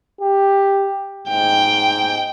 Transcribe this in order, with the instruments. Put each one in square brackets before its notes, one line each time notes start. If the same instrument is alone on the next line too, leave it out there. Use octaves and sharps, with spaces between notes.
[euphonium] G4
[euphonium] G#2 [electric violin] G5